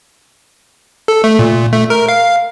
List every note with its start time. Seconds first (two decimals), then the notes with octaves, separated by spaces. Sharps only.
1.08 A4
1.24 A3
1.39 A#2
1.73 A3
1.90 A#4
2.08 F5